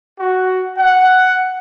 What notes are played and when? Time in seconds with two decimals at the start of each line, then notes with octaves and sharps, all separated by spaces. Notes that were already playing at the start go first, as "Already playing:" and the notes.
0.19 F#4
0.77 F#5